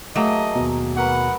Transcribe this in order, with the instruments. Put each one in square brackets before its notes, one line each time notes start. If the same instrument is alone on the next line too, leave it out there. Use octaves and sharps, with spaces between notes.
[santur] F#3 A#3 G#4 [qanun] A3 [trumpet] D#5
[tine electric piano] D#2 B2
[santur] F#4 A#4 B4 [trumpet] F#5